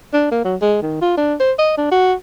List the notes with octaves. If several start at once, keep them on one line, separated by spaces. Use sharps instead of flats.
D4
A#3
F#3
G#3
D#3
F4
D4
C5
D#5
D4
F#4